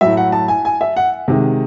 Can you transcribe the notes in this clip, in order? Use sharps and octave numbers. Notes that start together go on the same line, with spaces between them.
A2 F#3 E5
F#5
A5
G#5
G#5
E5
F#5
C3 D#3 G#3